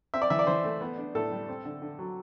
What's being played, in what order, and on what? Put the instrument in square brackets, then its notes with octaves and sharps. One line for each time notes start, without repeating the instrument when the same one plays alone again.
[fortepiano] C4 E5
D5
E3 E5
D5
E3 C5
A3
B3
D4
A2 A4
G3
C4
D3
D3
F#3